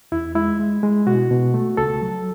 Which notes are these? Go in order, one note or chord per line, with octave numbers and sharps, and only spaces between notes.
E2 E4
G#3 E4
G#3
G#3
B2 F#4
B2
A3
C#2 A4
F#3